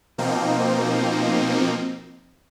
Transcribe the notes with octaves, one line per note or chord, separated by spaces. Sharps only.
B2 F3 A#3 C4 D#4